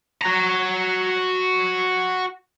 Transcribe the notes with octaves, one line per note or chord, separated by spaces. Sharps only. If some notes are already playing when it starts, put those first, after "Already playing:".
F#4 A#5